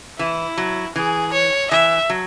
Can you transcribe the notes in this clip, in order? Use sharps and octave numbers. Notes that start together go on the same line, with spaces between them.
E3 E4
F#3
E3 G#4
C#5
E3 E5
F#3